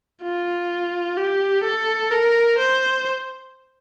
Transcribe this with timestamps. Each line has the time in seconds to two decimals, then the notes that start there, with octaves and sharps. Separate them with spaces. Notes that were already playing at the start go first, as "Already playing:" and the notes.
0.23 F4
1.17 G4
1.64 A4
2.11 A#4
2.58 C5